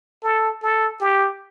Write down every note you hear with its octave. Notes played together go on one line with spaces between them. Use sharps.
A4
A4
G4